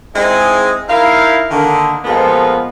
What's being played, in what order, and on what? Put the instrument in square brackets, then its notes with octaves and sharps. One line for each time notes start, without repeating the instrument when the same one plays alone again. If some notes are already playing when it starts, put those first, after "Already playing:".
[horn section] G#3 C4 D#4 E4 G#4
D#4 E4 A#4 F5
D3 D#3 A#3
A#2 F3 G#3 B3 F4 A4